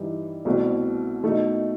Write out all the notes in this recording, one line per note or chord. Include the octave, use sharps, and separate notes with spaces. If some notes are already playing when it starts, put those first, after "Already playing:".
Already playing: G2 E3 G3 D#4
C2 B2 A3 C4
B2 A3 D#4